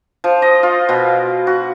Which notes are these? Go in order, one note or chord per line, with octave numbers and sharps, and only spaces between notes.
F3
D#5
F4
B2
F#4